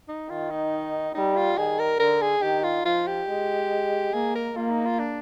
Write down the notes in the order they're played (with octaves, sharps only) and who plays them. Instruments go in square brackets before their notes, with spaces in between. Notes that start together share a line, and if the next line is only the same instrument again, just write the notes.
[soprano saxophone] D#4
[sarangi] D#3 [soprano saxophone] F4
[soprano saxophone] D#4
[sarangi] G3 [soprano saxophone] D#4
[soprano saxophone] F4
[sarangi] D#3 [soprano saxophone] G#4
[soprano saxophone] A#4
[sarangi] D3 [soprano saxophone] A#4
[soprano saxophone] G#4
[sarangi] D#3 [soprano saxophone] G4
[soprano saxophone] F4
[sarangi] F3 [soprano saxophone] F4
[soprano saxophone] G4
[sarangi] G#3
[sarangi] A#3 [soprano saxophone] G#4
[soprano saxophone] A#4
[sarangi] A#3 [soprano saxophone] F4
[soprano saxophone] D#4
F4
D4